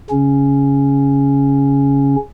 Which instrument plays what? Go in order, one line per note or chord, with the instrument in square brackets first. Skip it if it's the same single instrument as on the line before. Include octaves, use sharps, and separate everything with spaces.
[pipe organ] C#3 C#4